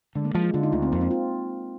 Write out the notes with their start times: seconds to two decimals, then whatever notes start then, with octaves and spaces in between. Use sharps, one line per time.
0.15 D3 G#3
0.25 A#3
0.35 F3 G#3
0.43 F4
0.54 D3 F4
0.63 D#4
0.72 D2 F4
0.82 C4
0.92 F2 A#3
1.01 C4
1.11 F4